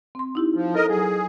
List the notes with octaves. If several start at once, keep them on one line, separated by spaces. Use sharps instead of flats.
C4 C6
D#4 E4 G4
F3
A4 A#4 C5 D#5
F#3 G#4